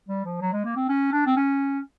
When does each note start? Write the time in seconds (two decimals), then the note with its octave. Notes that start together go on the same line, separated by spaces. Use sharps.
0.09 G3
0.25 F3
0.41 F#3
0.53 G#3
0.65 A#3
0.76 C4
0.89 C#4
1.12 D4
1.26 C4
1.37 C#4